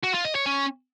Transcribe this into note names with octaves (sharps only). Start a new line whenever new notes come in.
F#4
F4
D#5
C#5
C#4